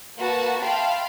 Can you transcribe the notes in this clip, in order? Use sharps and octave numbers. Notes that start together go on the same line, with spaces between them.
A#3 F#4 B4 A5
E5 F5 G5 A5 B5 C6